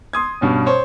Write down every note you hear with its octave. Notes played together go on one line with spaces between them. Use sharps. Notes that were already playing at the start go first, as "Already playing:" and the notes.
C6 D#6 G#6
G2 B2 C#4
C5 C#5